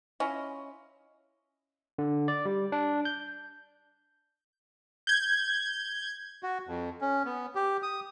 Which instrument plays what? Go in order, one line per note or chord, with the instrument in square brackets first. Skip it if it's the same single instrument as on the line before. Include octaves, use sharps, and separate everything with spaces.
[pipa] C#4 E4 F4 D#5
[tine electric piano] D3
D5
G3
D4
G6
[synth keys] G6 G#6
[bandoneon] F#4
F2
C#4
B3
G4
D#6